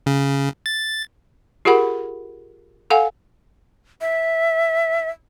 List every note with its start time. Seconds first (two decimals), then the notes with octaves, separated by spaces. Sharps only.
0.06 C#3
0.66 A6
1.65 F4 G4 G#4 A#4 F#5 B5
2.90 A4 F5 F#5 G#5
4.01 E5